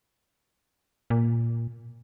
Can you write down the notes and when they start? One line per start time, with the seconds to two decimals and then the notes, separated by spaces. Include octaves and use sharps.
1.10 A#2